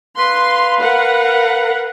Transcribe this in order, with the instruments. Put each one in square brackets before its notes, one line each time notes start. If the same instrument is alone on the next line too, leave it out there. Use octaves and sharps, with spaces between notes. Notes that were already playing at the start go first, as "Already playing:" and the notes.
[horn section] B4 F5 [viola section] C6
[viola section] A#4 F#5